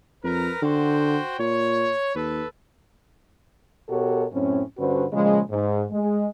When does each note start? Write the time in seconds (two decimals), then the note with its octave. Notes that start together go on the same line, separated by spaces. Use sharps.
0.24 F2 A#4 B4 A#5
0.62 D3 F#4 C5 G5
1.39 A#2 C#5
2.15 D#2 A4 B4
3.89 B2 F#4 G4 A4 A#4 C#5
4.33 F#2 A2 C4 C#4
4.78 G2 D3 C#4 F#4 B4 C5
5.13 A#2 C#3 F3 G#3
5.50 G#2
5.92 G#3